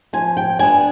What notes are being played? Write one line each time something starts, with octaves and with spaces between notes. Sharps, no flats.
F3 G#5
G5
B3 D4 G#5